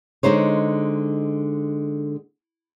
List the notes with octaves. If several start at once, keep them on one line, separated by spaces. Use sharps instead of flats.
D3 G#3 D#4 C5 C#5